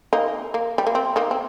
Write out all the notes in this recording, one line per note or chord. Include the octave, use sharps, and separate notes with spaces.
A#3 D#4
A#3
G3
A#3
C4
A#3 D#4
C4